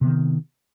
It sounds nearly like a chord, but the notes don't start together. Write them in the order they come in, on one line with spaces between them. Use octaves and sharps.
C3 B3 D#3